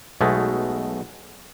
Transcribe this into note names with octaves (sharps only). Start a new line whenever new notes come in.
B1 B2 G#3 A3